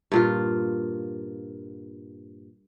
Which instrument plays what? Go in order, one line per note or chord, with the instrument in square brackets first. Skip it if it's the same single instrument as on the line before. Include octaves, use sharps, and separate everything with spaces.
[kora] G2 A#2 F4